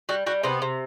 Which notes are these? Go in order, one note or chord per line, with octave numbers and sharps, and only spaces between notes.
G3 F#4
G3 F#4
C3 B3
C3